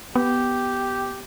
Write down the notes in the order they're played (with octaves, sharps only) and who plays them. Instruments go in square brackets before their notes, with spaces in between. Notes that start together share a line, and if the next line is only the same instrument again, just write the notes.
[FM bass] B3 [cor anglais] G4